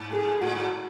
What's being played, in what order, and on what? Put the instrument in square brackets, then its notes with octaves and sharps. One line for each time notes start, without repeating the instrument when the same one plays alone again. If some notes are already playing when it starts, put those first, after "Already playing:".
Already playing: [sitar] G#2
[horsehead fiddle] G#4
[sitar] A2 [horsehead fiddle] F#4
[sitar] G#2